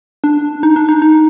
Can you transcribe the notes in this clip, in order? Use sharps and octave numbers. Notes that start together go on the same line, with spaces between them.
D4
D#4
D4
D#4
D#4